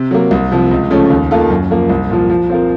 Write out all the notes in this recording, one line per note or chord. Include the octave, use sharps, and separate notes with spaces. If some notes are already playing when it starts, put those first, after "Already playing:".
Already playing: C3
F#3 A#3
C2
C3 F3
C#2
C#3 F3 A3 C#4
D#2
D#3 A#3 F4 A4
F#2
F3 A#3
C2
A#2 F3
F3
C4 F4 A#4